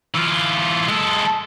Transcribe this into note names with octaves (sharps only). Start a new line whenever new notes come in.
E3 F4
G#3 A4